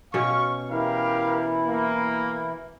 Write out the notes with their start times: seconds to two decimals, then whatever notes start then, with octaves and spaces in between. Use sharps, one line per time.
0.14 B2 C#4 F5 C#6
0.71 E3 E4 G4 A#4 F5
1.68 A#3